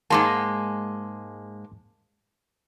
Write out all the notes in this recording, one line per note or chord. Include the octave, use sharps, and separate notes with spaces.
G#2 G#3 A#3 A5 C6 D6